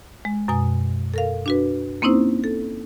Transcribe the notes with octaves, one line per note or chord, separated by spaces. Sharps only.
G#3
F#2 B2 G#5 D#6
A4 A#4 F5
D4 F#4 B4
A#3 C4 C#4 D#4 E4 C5
A4